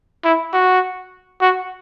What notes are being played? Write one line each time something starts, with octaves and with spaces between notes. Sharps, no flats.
E4
F#4
F#4